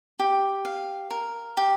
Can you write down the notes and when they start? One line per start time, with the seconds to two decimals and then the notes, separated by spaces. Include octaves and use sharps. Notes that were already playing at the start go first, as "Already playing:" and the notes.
0.19 G4
0.65 F5
1.11 A#4
1.57 G4